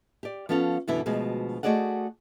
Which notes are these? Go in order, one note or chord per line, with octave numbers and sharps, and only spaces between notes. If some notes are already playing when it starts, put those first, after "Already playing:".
G4 D5
F3 B3 C#4 A4 F5
F#2 B2 D3 E3 E4
D2 B2 F3 G#3
A3 F#4 G#4 D5 D#5 F#5